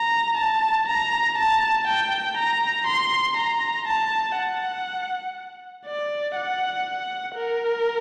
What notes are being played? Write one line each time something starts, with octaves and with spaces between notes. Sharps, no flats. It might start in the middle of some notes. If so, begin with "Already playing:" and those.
Already playing: A#5
A5
A#5
A5
G5
A#5
C6
A#5
A5
F#5
D5
F#5
A#4